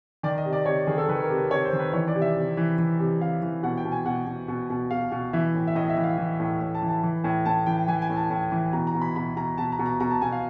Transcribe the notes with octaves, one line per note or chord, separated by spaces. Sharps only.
D#3 D5
D#5
C3
D5
C3 C#5
D#3 G#4
A4
D#3 B4
A#4
C3
B4
C3 C#5
C5
D#3
B4
E3 C#5
D5
C3
E5
C3
E3
E3
C3
C3 F5
E3
B2 F#5
G5
B2
G#5
B2 F#5
B2
B2
B2
B2 F5
B2
E3 E5
A2
E5
A2 D#5
E5
E3
F5
E3
A2
A2
A5
E3
A5
E3
A2
A2 A5
E3 G5
E3 G#5
G#5
A2
A5
A2
E3
B2 A#5
A#5
B2
B5
B2 B5
B2 A#5
B2 A5
A#5
B2
A#5
B2 A#5
A5
B2 G#5
F5